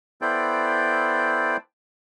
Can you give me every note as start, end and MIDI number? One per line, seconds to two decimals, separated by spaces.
0.22 1.57 59
0.22 1.57 64
0.22 1.57 69
0.22 1.57 72
0.22 1.57 74
0.22 1.57 79